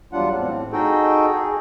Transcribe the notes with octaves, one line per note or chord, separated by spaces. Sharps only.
E2 F#3 G3 D4 F4 F#5
A2 C4
D#4 F#4 G#4 A4 D#5 G5
G#4